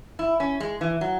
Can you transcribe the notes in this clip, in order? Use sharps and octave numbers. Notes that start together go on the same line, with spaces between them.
E4
C#4
G#3
E3
F#3